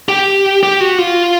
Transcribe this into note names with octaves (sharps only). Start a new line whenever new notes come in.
G4
G4
F#4
F4